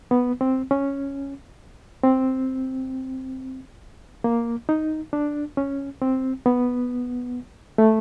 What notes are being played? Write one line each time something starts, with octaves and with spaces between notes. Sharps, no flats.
B3
C4
C#4
C4
A#3
D#4
D4
C#4
C4
B3
A3